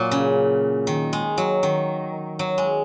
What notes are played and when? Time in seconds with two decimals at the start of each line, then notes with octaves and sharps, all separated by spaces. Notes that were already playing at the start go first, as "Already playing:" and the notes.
Already playing: A#2 F#3
0.11 C#3
0.87 D#3
1.13 G#3
1.38 F#3
1.63 D#3
2.39 F#3
2.58 G#3